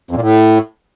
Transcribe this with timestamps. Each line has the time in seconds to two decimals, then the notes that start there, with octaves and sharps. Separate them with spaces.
0.11 F2
0.16 A#2
0.21 A2